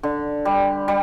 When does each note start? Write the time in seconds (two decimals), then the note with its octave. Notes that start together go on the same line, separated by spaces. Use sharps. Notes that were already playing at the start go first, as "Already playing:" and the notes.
0.03 D3
0.45 G3
0.88 G3